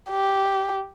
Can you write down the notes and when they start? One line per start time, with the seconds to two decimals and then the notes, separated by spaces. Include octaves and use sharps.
0.11 G4